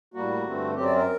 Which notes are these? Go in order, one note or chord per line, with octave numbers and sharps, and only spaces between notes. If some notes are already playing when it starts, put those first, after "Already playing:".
A2 G3 A#3 F#4
G2 D3 A3 C4
F#2 F#3 C4 G4
D5
A#4